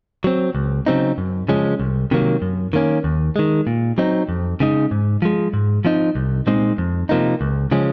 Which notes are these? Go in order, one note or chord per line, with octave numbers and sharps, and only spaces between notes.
F#3 C4
C#2
C#3 F#3 C4 D#4
F#2
C#3 F3 G#3 C#4
C2
C3 D#3 F#3 A#3
F#2
D#3 A#3 C#4
D#2
D#3 G#3
A#2
F#3 C4 D#4
F2
C#3 G#3 D#4
G#2
F3 G#3
G#2
F3 C4 D#4
C2
A#2 G#3 C4 D#4
F2
C3 F3 A#3 D#4
C#2
C#3 F3 G#3 C#4